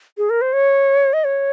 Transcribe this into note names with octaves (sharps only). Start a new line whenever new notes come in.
G#4
A#4
C5
C#5
D#5
C#5